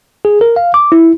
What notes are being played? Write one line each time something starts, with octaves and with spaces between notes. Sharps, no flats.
G#4
A#4
F5
D6
E4